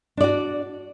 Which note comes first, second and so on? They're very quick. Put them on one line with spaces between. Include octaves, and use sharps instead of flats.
D4 D5 F#4